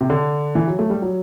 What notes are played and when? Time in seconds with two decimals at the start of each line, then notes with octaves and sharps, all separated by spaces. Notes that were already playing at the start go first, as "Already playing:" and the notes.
0.01 C3
0.10 D3
0.55 E3
0.68 F#3
0.79 A3
0.90 G3
1.02 F#3